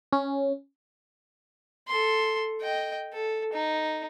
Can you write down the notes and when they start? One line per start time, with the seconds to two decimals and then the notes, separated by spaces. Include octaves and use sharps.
0.13 C#4
1.88 A4 C6
2.61 D#5 G5
3.13 A4
3.53 D#4